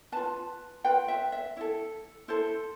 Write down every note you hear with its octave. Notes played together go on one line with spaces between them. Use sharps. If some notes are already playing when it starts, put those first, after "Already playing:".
F4 B4 A5
F4 B4 G5
E5
E5
E4 A4
E4 A4 C5